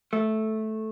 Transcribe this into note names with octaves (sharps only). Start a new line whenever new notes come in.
A3